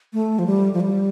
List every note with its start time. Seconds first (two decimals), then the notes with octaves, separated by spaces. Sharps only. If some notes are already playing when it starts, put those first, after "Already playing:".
0.13 A3
0.39 F3
0.46 G3
0.73 F3
0.80 G3